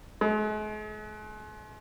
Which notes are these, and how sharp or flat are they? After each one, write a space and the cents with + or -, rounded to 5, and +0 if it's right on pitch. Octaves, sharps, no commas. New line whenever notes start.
G#3 +45